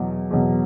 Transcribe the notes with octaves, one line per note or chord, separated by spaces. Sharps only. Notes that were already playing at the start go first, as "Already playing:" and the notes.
Already playing: E2 B2 F#3
E2 B2 F#3